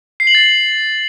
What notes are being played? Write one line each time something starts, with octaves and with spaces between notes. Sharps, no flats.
C7
F#7
A6